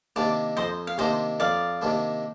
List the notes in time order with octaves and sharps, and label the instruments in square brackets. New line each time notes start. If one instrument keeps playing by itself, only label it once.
[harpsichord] C3 D#3 A#3 D4 [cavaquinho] D5
[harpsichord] F2 [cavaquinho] C5 D#5
[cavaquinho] F5
[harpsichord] C3 D#3 A#3 D4 [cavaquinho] C5 D#5
[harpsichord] F2 [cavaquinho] D5 F5
[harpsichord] C3 D#3 A#3 D4